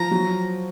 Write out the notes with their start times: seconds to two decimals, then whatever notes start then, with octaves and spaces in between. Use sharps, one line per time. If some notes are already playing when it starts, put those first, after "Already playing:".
Already playing: F3 A#5
0.11 F#3